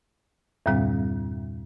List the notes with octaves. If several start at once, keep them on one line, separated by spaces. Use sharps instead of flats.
E2 G2 A#2 D3 G3 C4